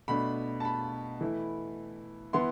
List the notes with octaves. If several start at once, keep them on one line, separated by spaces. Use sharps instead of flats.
B2 A3 D4 B5
A5
B5
E3 A3 E4
E3 B3 E4 C6